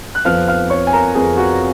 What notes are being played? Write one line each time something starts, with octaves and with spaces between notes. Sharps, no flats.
F#6
F2 F3 B3 F5 F6
F5 F6
C#5 C#6
G#5
A#4 A#5
F2 F3 B3 G#4 G#5
F#4 F#5